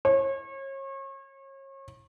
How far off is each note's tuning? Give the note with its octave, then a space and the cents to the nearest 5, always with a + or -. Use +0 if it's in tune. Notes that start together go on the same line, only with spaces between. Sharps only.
C#5 -35